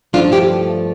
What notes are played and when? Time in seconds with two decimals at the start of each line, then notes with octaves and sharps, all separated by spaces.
0.13 G2 F3 A3 D4 F4
0.32 E4 G4